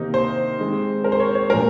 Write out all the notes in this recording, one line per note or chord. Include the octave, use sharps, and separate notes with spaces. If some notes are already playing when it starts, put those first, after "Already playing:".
Already playing: C3 D#3 A#3 D#4
C5
D#3 G#3 C4
A#4
C5
C#5
C#5
A#2 F3 G#3 A#4